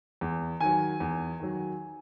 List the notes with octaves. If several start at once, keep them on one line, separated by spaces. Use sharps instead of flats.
E2
D#3 F#3 G#5
E2
D#3 F#3